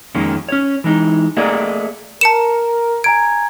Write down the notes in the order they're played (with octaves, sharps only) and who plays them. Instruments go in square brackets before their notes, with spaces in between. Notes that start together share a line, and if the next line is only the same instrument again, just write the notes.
[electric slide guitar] F2 D#3 G#3 A#3 C#4
C#4 C#5
E3 G#3 D#4
A3 A#3 G#4 A#4 D5 D#5
[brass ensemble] A#4 [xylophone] A5 C#7 E7
[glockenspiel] G#5 A#5 G#6 [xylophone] D7